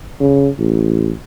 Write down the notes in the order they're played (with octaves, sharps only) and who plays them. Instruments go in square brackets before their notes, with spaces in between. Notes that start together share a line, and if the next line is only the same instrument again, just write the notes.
[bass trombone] C#3
A1